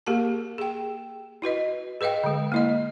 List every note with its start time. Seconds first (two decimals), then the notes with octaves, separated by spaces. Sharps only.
0.07 A#3 G4 G#4 A#4 A5
0.58 G#4 G5
1.42 E4 F#4 B4 D#5
2.01 G#4 B4 D#5 F5 G5
2.24 D3 G#3
2.52 A#3 E4 D#5